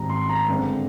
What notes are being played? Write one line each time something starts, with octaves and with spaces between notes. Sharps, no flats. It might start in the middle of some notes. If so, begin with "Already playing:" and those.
Already playing: G#1 G#2 G3 C4 A#5
C6
A#5
G1 G2 D3 G#3 C4